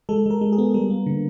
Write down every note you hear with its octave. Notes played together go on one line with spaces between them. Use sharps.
G#3 A4
G#3 A#4
G#3
G#4
B3
G3 A#4
A#3
D3